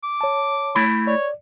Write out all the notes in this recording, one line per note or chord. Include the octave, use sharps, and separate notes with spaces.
D6
C#5 A5
A3 E4 B5
C#5 D5